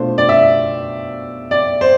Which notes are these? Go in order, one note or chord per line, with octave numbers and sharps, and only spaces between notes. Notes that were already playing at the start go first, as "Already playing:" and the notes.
Already playing: B2 A3 D4 F4 C5
D5
E5
D5
C5